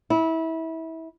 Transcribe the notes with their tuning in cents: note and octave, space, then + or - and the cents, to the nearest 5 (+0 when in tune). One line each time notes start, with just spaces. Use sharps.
E4 -25